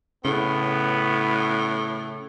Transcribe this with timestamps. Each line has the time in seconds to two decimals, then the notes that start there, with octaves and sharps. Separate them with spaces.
0.25 A2 C#3 B3